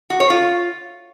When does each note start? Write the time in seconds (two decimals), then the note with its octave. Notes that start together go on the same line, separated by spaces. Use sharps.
0.10 F#4
0.20 C#5
0.30 F4